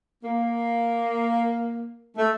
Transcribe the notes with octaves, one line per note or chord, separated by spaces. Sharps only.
A#3
A3